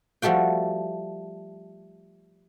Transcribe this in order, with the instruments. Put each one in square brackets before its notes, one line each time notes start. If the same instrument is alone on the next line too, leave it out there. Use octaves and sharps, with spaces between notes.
[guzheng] F3 G3 A3 F#4 G5